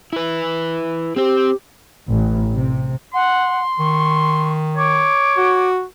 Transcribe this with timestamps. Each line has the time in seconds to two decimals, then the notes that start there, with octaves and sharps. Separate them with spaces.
0.13 E4 B4
1.16 C4 G4 C5
2.09 A1
2.53 C3
3.14 F#5 C6
3.79 D#3 C#6
4.78 C#5 D6
5.37 F#4